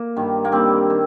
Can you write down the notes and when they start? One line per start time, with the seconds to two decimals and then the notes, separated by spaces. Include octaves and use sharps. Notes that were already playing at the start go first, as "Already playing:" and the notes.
Already playing: A#3
0.16 G2 D#3 G3
0.45 A#3
0.52 G2 D#3 G3 C4
0.90 D#3